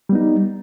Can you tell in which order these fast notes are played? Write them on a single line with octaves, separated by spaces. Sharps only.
G3 B3 D#4